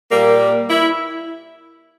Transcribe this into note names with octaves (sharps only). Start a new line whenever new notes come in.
A#2 G3 A#3
E4